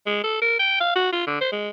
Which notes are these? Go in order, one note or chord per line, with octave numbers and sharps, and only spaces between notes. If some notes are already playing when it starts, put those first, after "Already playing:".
G#3
A4
A#4
G5
F5
F#4
F4
D3
C5
G#3